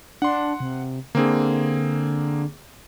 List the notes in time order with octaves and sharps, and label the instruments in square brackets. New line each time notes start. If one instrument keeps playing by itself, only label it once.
[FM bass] D4 [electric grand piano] F#5 C6
[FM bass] C3
[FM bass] D3 [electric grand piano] A#3 C4 G#4